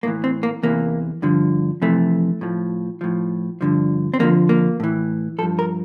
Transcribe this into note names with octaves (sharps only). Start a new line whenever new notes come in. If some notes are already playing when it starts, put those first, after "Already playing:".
A2 E3 A#3
C4
A#3
E2 C3 E3 A#3
G2 D3 F3
F2 C3 E3 A3
A2 F3
A2 F3
G2 D3 F3
C4
F2 D3 F3 A#3
A#3
A2 E3
G2 F3 A4
A#4